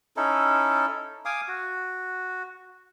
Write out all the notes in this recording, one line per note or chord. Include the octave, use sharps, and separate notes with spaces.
C#4 D#4 E4 A4
F5 G#5 D6 D#6
F#4